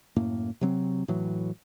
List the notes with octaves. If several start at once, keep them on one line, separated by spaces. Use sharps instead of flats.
F#2 A2 A#3
C3 F#3 C4
A2 E3 F#3